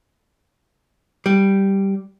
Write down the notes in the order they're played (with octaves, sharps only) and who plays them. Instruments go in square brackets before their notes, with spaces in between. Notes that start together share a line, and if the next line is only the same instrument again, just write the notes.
[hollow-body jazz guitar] G3